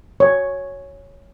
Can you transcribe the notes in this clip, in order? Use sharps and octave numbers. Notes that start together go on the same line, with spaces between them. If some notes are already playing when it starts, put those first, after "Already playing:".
C#5